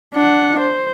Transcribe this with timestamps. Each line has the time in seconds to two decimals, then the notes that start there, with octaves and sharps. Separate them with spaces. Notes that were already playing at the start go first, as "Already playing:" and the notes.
0.14 D4 F#5
0.59 C5